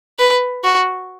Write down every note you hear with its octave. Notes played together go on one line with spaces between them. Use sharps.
B4
F#4